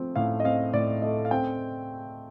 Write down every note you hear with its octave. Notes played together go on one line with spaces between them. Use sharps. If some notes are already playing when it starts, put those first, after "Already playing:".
Already playing: F3 A3 C4
A2 F5
D#5
C4 F5
A2 D5
A3 D#5
F5
C4 G5